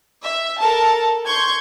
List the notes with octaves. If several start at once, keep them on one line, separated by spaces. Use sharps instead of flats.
E5
A4 A#4 A5
C6 C#6 G6 G#6